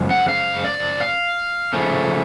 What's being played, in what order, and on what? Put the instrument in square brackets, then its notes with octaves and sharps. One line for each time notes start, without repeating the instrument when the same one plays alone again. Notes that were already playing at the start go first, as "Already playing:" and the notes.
Already playing: [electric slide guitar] F#2 C#3 F3 G#3
F#5
F5
D5
F5
C#3 F3 A3 C#4